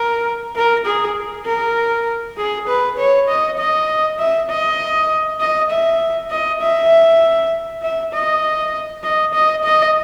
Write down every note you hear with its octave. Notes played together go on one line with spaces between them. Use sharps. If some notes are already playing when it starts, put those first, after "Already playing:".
Already playing: A#4
A#4
G#4
A#4
G#4
B4
C#5
D#5
D#5
E5
D#5
D#5
E5
D#5
E5
E5
D#5
D#5
D#5
D#5